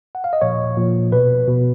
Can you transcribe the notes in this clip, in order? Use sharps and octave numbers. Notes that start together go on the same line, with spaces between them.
F#5
F5
D#5
A#2 F3 C#5
A#2 F3
B2 B4
B2